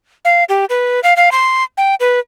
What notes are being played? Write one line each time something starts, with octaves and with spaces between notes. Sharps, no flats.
F5
G4
B4
F5
F5
C6
G5
B4